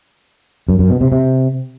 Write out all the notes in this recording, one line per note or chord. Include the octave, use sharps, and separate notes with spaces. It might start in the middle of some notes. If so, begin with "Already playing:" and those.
F#2
F#2
B2
C3
C3